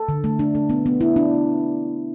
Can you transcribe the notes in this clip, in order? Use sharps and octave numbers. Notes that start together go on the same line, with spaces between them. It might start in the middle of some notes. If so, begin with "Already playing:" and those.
Already playing: A4
D3
A3
D4
A3
B3
B3
E4
D4